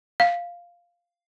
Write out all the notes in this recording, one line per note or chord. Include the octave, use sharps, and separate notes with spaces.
F5